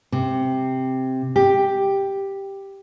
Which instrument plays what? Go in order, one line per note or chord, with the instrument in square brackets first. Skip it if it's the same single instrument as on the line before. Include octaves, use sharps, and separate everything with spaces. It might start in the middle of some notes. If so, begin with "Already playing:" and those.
[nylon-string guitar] C3
G4